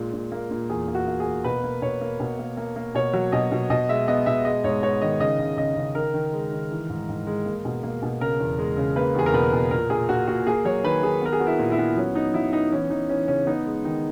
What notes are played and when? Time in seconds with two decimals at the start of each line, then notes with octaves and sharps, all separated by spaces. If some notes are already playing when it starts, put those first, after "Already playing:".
Already playing: A#2 G#3
0.13 A#2
0.32 A#3
0.51 A#2
0.69 E2 G#4
0.88 A#3
0.95 F#4
1.07 A#3
1.20 G#4
1.26 A#3
1.44 B2 B4
1.64 A#3
1.82 B2 C#5
2.01 A#3
2.20 B2
2.39 A#3
2.57 A#3
2.76 A#3
2.95 B2 C#5
3.13 F#3
3.32 B2 D#5
3.51 B2
3.70 B2 D#5
3.89 G#3 E5
4.08 B3 D#5
4.26 B2 E5
4.45 G#3 D#5
4.64 G#2 C#5
4.82 B3 C#5
5.01 D#3 D#5
5.20 C#3 D#5
5.39 C#3
5.58 C#3 D#5
5.76 C#3
5.95 D#3 A#4
6.14 D#3
6.33 G#3
6.52 D#3
6.71 E3
6.89 G#2
7.09 G#2
7.27 G#3
7.46 A#3
7.65 B2
7.83 A#3
8.02 B2
8.20 C#3 A#4
8.40 E2
8.58 G#3
8.77 C#3
8.96 A#3 B4
9.15 E2 G#4
9.26 A#4
9.33 B2 B4
9.53 B2
9.71 A#2 A#4
9.90 A#2 G#4
10.09 A#2 F#4
10.27 A#2 F#4
10.47 A#3 G#4
10.65 F#3 C#5
10.84 D#3 B4
11.03 D#3 G#4
11.22 B3 A#4
11.33 G#4
11.40 B3 F#4
11.47 E4
11.59 A#2
11.72 E4
11.78 B3
11.97 F#3 C#4
12.15 B3 D#4
12.34 F#3 E4
12.53 B3 D#4
12.72 E3 C#4
12.90 E3 D#4
13.09 E3 C#4
13.28 C#3 C#4
13.47 B3 D#4
13.66 G#3
13.84 D#3 D#4